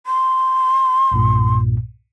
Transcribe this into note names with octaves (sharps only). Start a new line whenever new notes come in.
C6
B1 G2 A#2